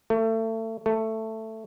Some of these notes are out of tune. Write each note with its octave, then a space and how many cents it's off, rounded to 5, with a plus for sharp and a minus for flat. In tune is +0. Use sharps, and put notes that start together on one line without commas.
A3 +30
A3 +10